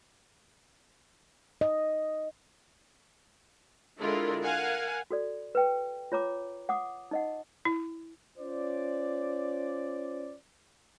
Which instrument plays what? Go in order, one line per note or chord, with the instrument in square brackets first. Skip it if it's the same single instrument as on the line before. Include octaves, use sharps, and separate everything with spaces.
[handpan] D#5
[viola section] D3 G#3 D4 E4 F4 A#4
A#4 F5 F#5 G#5
[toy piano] F#4 A4 D5
B4 G5
F4 C#5 A#5 D6
F#5 D6 D#6
D#4 D#5 F#5
[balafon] E4
[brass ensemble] C#4 F4 C5 D5